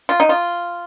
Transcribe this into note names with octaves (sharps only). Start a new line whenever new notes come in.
F4
D#4
F4